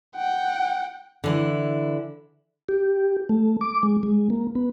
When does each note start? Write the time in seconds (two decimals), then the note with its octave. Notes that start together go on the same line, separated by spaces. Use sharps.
0.15 F#5 G5
1.24 D3 E3 E4
2.69 G4
3.29 A3
3.61 D6
3.83 G#3
4.03 G#3
4.30 A#3
4.55 B3